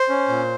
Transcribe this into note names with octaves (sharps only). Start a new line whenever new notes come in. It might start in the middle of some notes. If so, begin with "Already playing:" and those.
Already playing: C5
C#4
A#2